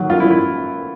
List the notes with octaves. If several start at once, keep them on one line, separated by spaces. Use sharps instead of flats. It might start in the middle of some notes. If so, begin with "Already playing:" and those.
Already playing: D#3 F#3
F#2 F4
E4
F#2
E4